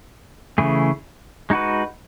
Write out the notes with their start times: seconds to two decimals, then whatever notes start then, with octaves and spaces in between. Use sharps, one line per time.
0.58 C#3 E3 A3 E4 G#4
1.50 G#3 D#4 F#4 B4